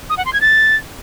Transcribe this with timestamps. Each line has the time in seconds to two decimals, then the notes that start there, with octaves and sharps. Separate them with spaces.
0.10 D#6
0.17 F#5
0.25 C6
0.33 G#6
0.41 A6